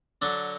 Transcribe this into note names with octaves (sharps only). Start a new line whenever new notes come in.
D3 F#3 D4